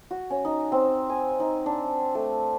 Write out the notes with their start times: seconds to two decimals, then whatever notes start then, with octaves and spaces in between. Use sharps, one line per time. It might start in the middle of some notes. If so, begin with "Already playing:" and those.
0.11 F#4
0.30 C#4
0.45 D#4
0.72 C4
1.10 G#5
1.40 D#4
1.66 D4
2.15 A3